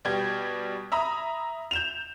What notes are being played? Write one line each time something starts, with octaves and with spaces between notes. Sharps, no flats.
B2 G3 G4 G#6
E5 A#5 B5 D#6
G6 E7 F7